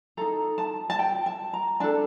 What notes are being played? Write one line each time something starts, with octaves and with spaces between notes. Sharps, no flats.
D#4 A4 A#5
A5
A5
G5
A5
A#5
D4 A4 A5